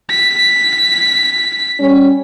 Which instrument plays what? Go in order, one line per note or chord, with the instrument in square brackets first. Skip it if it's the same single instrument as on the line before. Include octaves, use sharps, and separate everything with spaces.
[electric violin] B6
[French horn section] G3 C#4